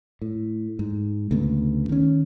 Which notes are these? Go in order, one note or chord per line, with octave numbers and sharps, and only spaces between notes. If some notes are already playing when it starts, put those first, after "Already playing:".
A2
G#2
D2 C#3 A3 B3
D#3 C#4